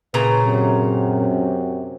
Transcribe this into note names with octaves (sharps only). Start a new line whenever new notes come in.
A#2 C#3 B4 A#5
F#2 C3